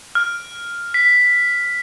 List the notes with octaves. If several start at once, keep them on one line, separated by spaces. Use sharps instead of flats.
F6
B6